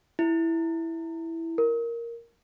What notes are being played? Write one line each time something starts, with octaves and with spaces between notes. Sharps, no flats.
E4
A#4